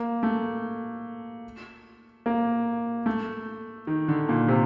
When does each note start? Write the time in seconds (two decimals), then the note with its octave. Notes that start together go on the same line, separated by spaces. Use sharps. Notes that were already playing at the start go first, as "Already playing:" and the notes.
Already playing: A#3
0.23 A3
2.26 A#3
3.06 A3
3.87 D#3
4.08 D3
4.29 A#2
4.48 C3